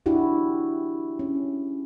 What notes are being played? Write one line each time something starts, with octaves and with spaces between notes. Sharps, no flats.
D4 E4 F#4 G4
C#4